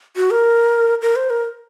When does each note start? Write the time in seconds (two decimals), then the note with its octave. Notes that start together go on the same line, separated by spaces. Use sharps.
0.16 F#4
0.31 A#4
1.02 A#4
1.16 C5
1.30 A#4